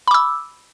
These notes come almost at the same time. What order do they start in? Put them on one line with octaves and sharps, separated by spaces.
B5 D6 E6